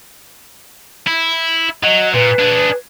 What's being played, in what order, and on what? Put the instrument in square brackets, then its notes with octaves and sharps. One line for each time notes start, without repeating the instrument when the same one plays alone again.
[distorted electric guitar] E4
[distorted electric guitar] F#3 [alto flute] D#5
[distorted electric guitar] A#2 [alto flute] B4
[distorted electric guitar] D4 G#4